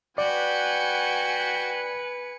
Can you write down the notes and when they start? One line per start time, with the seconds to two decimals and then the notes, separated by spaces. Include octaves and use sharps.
0.18 F#4 B4 D5 G5 G#5 C#7